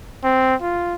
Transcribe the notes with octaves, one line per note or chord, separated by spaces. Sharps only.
C4
F4